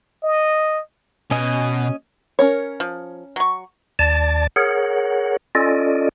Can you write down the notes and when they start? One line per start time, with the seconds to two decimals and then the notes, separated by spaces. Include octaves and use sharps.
0.23 D#5
1.31 B2 C#4 D#5 G#5
2.39 C#4 A#4 C#5
2.80 F3
3.36 F#3 C#6
3.99 D#2 D5 A5 A6
4.56 G#4 A#4 C#5 F#5
5.55 C#4 F4 A4 D5 D#5